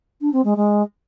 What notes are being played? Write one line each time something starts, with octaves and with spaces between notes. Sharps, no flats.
D4
C4
G#3
G#3